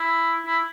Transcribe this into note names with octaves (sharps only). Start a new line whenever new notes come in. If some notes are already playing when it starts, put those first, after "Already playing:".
Already playing: E4
E4